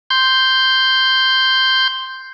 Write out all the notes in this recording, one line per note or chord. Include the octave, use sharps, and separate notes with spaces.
C6 G6